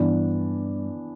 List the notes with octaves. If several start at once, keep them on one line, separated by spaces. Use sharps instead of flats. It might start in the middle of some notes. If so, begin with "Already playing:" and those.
Already playing: G2 E3 B3 D4